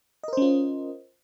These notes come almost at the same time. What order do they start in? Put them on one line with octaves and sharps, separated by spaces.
D#5 A#4 C5 C#4 F4